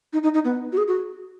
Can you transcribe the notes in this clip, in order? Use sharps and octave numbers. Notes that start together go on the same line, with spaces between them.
D#4
D#4
D#4
B3
F#4
G#4
F#4